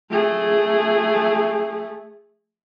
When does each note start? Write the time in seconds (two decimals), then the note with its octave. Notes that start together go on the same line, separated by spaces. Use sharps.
0.11 A3 G#4